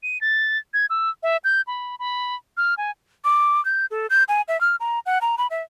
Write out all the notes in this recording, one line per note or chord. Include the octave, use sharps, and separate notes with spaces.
D#7
A6
G#6
E6
E5
G6
B5
B5
F6
G#5
D6
G6
A4
G6
G#5
E5
F6
A#5
F#5
A#5
B5
E5